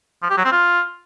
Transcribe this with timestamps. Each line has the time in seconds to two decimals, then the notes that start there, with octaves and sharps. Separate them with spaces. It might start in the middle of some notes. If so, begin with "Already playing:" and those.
0.23 F3
0.30 G4
0.37 F#3
0.45 C4
0.52 F4